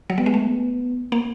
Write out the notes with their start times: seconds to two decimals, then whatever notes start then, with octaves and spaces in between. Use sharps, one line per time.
0.10 F#3
0.18 G3 B3
0.26 G#3
0.34 A3
0.50 B3
1.12 A#3